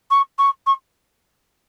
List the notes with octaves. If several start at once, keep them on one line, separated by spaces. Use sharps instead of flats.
C#6
C#6
C#6